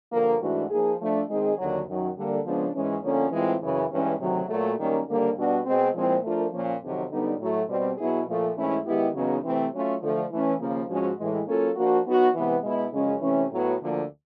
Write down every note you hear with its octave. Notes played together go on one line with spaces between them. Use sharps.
G2 D3 F3 A#3
G#2 E3 A3 D4 F#4
F3 A#3 D#4 G#4
F3 A3 D4
D#3 G#3 C4 D#4 G#4
D#2 D3 F#3
F#2 D#3 F#3
D3 G3 A#3
C#3 F3 G#3 B3 D4
G#2 E3 G#3 C#4
F2 D3 F3 A#3 C#4
A2 E3 G#3 C4 F4
F#2 C#3 E3
G2 E3 G#3 C#4
D2 C3 D#3 F#3
A#2 F#3 A3
F#2 D#3 G3 A#3 C#4
D#2 D3 G3 A#3 D4
B2 G3 B3 D4 F#4
B2 G#3 C4
A#2 F3 G#3 C4 E4
F3 A3 D4 F4 A#4
A#2 F3 A#3 C#4
F2 C3 D#3 F#3
F#2 D3 G3 B3 D#4
A2 F#3 A3
B2 G3 C4
B2 F#3 B3 E4 G#4
A#2 F3 A3
G#2 E3 A3 C#4 E4
D#3 G#3 B3 E4 G4
E2 C#3 F#3 B3 D#4
C3 E3 A3 C4
F#3 A3 C#4 F4
D3 F3 A3
E3 A3 C#4
D#2 C#3 F3 A#3
G#2 F3 G#3 C#4 F#4
A2 E3 G#3
F#3 A#3 C#4 F4 A4
F3 A#3 D4 F#4
F#3 B3 D#4 F#4
C3 E3 G#3 B3
B2 G#3 B3 E4
F#2 C#3 F3 G#3 C#4
C3 E3 A3 C#4
A2 F#3 B3
D2 D3 F3 A#3